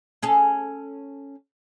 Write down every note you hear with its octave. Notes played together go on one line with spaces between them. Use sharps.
C#4 G#4 A4